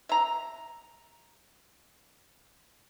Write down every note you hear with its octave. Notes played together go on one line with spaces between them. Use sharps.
E5 A#5